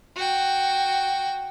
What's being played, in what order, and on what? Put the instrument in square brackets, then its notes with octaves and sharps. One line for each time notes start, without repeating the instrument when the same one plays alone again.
[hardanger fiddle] F#4 G5